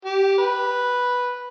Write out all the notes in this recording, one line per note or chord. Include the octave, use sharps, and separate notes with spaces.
G4
B4